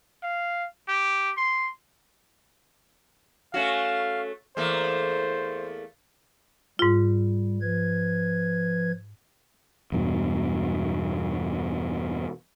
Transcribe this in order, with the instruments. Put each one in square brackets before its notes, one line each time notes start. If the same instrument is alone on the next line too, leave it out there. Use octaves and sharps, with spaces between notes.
[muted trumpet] F5
G4
C6
[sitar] A3 C#4 F#4 [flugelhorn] F5
[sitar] E2 A3 A#3 [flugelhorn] C5
[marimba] G#2 F4 [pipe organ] G3
[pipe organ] F3 B4 G#6
[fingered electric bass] E2 G2 B2